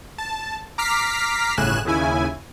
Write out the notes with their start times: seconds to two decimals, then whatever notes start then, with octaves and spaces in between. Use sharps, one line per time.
0.18 A5
0.78 A#5 D6 F6 B6 C7
1.57 G1 A2 C#3 G#5 F#6 E7
1.85 D#2 C#3 E4 G#5